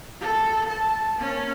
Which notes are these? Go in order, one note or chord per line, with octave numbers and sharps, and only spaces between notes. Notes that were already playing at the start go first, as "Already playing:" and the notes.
A4
A5
A#3 C#4